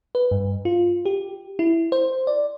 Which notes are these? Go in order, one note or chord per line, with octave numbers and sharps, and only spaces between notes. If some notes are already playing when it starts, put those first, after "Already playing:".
B4
G2
F4
G4
E4
C5
D5